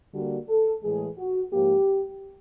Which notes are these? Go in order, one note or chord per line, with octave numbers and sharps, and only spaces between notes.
D3 G3 A#3 F#4
A4
A2 E3 G#3 G#4
F#4
G#2 F3 A#3 G4